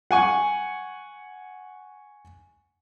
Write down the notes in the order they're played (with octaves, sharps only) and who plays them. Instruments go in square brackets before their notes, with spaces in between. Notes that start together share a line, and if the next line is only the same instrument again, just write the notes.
[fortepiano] F#5 G#5 C#6